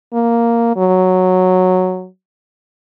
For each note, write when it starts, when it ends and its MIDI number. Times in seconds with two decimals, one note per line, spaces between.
0.13 0.75 58
0.77 2.07 54